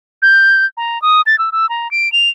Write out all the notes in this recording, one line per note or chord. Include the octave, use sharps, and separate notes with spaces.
G6
A#5
D#6
A6
E6
E6
A#5
D7
F7